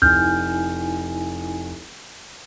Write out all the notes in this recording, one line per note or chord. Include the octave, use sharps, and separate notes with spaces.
F1 D#4 E4 G#5 F6 G6